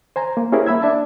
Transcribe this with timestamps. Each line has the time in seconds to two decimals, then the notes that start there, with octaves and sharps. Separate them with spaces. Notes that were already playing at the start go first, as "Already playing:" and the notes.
0.16 C5 G#5 A#5
0.37 A#3
0.52 C#4 E4 G4 G#4 A#4 C5
0.67 A#3 E5 B5 E6 G#6
0.82 D4 E5 A5